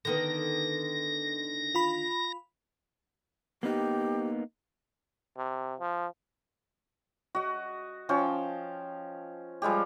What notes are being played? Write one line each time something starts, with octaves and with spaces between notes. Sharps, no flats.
D3 D#3 B3 A#6
F4 B5
A#3 B3 D#4 G4
C3
F3
F#4 D#5
F3 C#4 G5 A5
F3 G3 G#3 G4